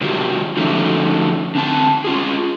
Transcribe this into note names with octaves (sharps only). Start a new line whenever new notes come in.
C3 D#3 F#3 F4 G4
D3 F3 F#3 A3 C#4 D#4
D3 C4 A5
C#4 F4 G#4